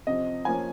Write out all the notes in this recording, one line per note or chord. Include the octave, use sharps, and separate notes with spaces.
C3 F3 C4 D#5
F3 A#3 C#4 G#5